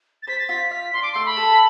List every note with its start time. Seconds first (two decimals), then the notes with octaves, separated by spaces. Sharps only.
0.23 A6
0.27 C5 B6
0.39 A6
0.49 F4 B6
0.71 F5 B6
0.93 D4 C6
1.03 D6
1.12 A3 C6
1.26 B5
1.37 A4